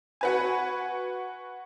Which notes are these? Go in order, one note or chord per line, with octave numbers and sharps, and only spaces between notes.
F#4 B4 G#5